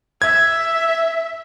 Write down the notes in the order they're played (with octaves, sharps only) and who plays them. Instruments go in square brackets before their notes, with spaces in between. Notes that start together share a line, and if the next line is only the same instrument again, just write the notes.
[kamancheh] E5 [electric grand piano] G#6